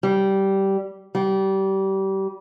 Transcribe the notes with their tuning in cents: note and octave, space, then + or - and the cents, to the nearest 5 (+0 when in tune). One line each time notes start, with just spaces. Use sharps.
G3 -15
G3 -25